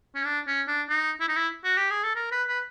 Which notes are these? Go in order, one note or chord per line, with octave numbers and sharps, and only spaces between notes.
C#4
D4
C#4
D4
D#4
E4
D#4
E4
F#4
G4
G#4
A4
A#4
B4
B4